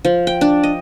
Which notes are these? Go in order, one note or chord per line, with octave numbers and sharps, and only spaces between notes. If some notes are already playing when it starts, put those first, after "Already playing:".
F3
G5
D4
D#5